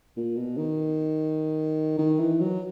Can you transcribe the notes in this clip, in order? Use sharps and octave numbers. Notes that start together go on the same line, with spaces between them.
A#2
B2
D#3
D#3
E3
F#3